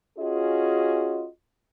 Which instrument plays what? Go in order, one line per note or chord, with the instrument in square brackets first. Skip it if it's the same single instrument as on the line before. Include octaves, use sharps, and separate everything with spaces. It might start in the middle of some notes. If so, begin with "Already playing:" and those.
[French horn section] C#4 F4 F#4 G#4 D#5